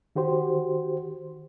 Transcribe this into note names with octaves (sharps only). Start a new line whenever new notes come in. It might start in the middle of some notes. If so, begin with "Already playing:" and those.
D#3 F#4 G4 C5